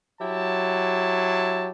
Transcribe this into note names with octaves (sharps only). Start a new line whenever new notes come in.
F#3 E4 G4 A5